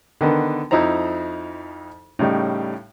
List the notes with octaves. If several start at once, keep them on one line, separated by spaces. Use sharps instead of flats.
D3 D#3 B3
F2 F3 D#4 E4 C5 A#5
A2 C#3 G3 D#4